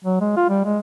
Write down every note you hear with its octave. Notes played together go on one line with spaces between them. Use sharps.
F#3
G#3
F4
G3
G#3